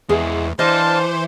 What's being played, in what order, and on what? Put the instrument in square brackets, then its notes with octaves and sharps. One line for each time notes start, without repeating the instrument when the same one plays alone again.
[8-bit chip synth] E2 [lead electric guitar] G#3 E4 [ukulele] G#4
[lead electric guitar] E3 [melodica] D4 F5 A5 [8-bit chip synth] C5 [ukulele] D#5